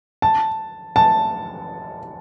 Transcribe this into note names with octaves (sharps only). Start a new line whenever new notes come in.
A5
A5